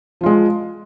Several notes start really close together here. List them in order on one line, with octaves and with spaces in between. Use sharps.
F3 F4 G#3